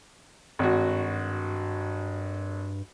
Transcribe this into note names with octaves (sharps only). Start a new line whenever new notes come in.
G#1 G2 F#4